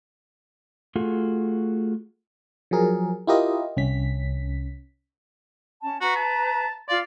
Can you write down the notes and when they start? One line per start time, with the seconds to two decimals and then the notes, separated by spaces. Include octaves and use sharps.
0.96 A3 F4 F#4 G#4 A4
2.71 F3 F#3 G#4 A#4
3.27 E4 F4 G4 A#4 D#5
3.77 C2 C#4 B6
5.82 C#4 A5
6.01 F#4 B4 A#5
6.16 A5
6.89 F4 D5 F5 C6